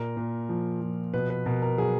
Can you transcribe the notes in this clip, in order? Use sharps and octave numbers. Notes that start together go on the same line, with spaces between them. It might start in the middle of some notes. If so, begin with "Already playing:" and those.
Already playing: A#2 A#4
A#2
F3
F3
B2 B4
B4
B2 A#4
A#4
F#3 G#4